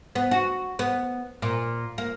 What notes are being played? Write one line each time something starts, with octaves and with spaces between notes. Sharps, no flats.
B3
F#4
B3
A#2
A#3